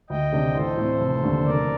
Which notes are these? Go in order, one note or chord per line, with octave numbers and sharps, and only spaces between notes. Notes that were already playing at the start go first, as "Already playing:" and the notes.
D2 D#5 G5
C3 D#3 A3 D4
A1 A4 C5
A2 A3 C4
F1
D#2 D3 A3 D4
F1 A#4 D5